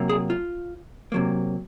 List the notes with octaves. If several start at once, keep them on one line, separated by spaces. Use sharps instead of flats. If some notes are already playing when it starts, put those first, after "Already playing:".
Already playing: C3 F#3 A#3
G#4
F4
C3 F#3 A#3